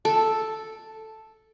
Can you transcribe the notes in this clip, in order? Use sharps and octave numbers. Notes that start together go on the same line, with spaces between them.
A4